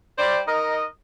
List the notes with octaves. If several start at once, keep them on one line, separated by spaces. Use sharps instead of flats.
G3 C5 D5
D#4 A#4 D#5